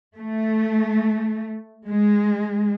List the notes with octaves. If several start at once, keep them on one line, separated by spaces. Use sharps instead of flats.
A3
G#3